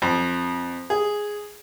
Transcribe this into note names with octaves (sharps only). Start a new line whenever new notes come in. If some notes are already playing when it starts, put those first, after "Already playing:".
F2
G#4